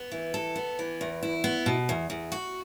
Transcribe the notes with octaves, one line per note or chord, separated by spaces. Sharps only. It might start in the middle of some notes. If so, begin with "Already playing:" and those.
Already playing: B3
E3
A4
B3
E3
E2
E4
B3
B2
E2
E2
F#4